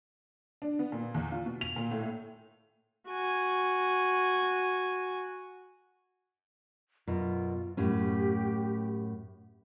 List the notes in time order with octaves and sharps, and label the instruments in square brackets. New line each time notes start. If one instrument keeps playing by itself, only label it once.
[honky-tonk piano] D4
B3
A#2
E2
F4
B2
F7
A#2
A2
[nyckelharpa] F#4 G#5
[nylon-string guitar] F#2 B2 [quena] F4
[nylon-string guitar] F#2 A2 C#4 [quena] G4